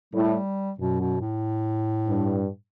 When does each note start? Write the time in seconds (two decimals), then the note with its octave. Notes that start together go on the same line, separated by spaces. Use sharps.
0.14 A2 G3
0.78 F#2 B2
1.00 B2
1.21 A2
2.07 G2